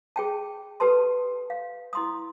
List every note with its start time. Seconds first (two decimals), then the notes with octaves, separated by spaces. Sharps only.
0.16 G#4 G5 A5
0.80 G4 A4 B4 A5 C6
1.50 F5
1.93 E4 C6 D#6